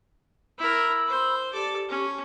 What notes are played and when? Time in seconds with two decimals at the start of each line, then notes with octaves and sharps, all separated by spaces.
0.58 E4 A#4 B5 E6
1.07 C5
1.53 G4 A4 D5
1.89 C#4